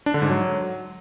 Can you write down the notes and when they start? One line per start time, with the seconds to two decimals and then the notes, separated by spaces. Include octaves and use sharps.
0.06 D4
0.14 D3
0.22 G#2
0.30 F#3